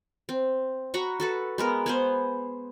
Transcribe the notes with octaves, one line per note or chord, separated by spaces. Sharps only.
C4
F#4 A#5 B5 C#6
F#4 A4 B4
G#3 B3 A#4
B3 G#4 C5